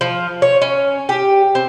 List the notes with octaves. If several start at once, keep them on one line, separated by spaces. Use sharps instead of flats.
F3
C#5
C#4
G4
C4